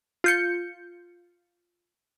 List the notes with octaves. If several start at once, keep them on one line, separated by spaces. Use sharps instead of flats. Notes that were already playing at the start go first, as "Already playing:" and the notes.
F4 G6 C#7